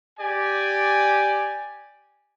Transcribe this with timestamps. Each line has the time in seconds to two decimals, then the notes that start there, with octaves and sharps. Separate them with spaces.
0.20 G4 D5 G#5